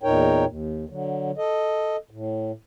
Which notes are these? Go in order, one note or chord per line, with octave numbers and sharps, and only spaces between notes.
E2 A#2 D#4 A#4 C#5 G5
D#2
D3 F#3
A4 D#5
A2